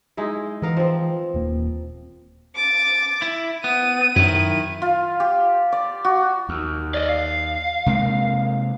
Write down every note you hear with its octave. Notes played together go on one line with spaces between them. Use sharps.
G#3 D#4 E4
E3 B3 A#4 F5
F3 C4
D#1 A#3
D6 A6
E4
B3 D#7
F#2 D#3 E4
F4
G4
D5
F#4
D#2
D5 D#5
F5
C3 G#3 A#3